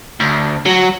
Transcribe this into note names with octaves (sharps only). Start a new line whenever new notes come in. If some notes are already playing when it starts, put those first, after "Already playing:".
D2
F#3